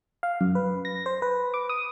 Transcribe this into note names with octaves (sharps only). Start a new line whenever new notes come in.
F5
F#2
B4
A#6
C5
B4
D6
D#6